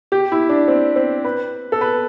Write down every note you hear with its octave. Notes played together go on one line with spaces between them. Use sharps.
G4
E4
D4
C4
C4
B4
A4
B4